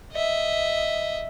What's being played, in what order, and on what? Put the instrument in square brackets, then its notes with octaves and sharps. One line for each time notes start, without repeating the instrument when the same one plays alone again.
[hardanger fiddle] D#5 E5